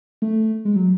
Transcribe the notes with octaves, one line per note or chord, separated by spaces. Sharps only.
A3
G#3
F#3